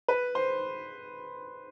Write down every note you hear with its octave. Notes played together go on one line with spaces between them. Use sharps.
B4
C5